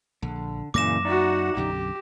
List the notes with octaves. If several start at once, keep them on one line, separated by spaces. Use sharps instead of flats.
A#1 D3
F#2 A#2 C#3 E3 A#3 D6 A#6 E7
D#4 F#4 D5 E5 F#5
B1 F#2 D3 G4